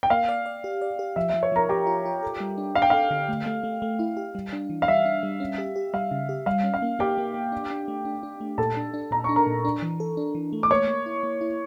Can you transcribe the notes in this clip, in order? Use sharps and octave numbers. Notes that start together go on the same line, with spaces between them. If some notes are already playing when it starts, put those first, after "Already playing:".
G5
A#3 F5
D5
D5
G4
D5
G4
F3 E5
E5
F3
C#5 C#6
F3 A#4 A#5
F3 G4 G5
F4
F4
A4
G3
D4
D4 F5
G5
A4 F5
D3
A3
A3
A3
A3
E4
G4
G3
D4
E3
F5
G3 E5
D4
G3
C#4
G4
G4
G3 F5
C#3
G4
G3 F5
C#4
F5
A#3
A#3 G4 G5
A#3
A#3
D4
D4
A3
D4
D4
A3
A#2 A4 A5
D4
D4
A#2 A#5
D4 C#6
A#4 A#5
A#2
D4
E3
A4
D4
E3
A3
D6
A#3 C#5 C#6
A#3
E4
A#3
E4